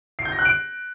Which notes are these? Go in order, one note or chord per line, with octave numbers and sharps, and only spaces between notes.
C7
G6
A#6
F#6
D7